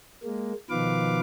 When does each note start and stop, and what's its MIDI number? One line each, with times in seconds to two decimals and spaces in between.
0.24 0.53 56
0.24 0.53 58
0.70 1.20 47
0.70 1.20 51
0.70 1.20 53
0.70 1.20 71
0.70 1.20 77
0.70 1.20 86